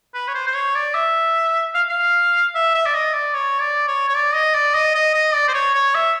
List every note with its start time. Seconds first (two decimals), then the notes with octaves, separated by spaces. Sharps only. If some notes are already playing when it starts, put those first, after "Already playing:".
0.14 B4
0.28 C#5
0.35 C5
0.47 C5
0.54 C#5
0.75 D5
0.95 E5
1.74 F5
1.89 F5
2.55 E5
2.75 E5
2.86 D5
2.94 D#5
3.14 D5
3.34 C#5
3.61 D5
3.88 C#5
4.09 C#5
4.15 D5
4.34 D#5
4.55 D5
4.74 D#5
4.95 D#5
5.14 D#5
5.34 D5
5.48 C5
5.54 C#5
5.74 C#5
5.95 E5